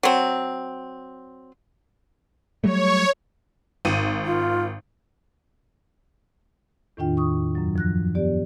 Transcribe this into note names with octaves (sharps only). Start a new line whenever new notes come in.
F#3 C4
F#3 G3 A3 C#5
G#1 D#7
F4
E2 A2 D#3 D4 F4 G5
C#6 D#6
F#2 F#3
F3 F#6 A#6
B3 G4 D5